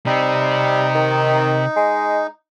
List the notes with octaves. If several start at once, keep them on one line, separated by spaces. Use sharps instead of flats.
C3 G3 C4 D#4
D#3
G#3